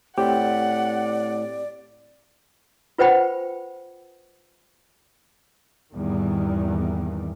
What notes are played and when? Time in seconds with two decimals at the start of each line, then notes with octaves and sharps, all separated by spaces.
0.18 A2 C4 G4 D5 F#5
2.98 F4 B4 C5 F#5 G5 B5
5.93 G#1 E2 D#3 G3